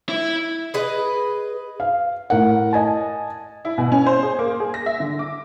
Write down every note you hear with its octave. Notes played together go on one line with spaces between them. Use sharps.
E4
G#4 B4 D#5
F5
A2 A#4 F#5
D#5 G#5 A5
E4
B2
C#4
C5
G#4
A#3
G#4
A#6
E5
D3
D6